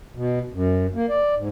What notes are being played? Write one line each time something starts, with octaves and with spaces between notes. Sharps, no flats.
B2
F#2
A#3
D5
G#2